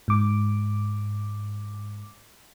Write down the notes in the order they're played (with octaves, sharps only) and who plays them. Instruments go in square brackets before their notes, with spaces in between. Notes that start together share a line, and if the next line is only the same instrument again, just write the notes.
[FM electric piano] G#2 D6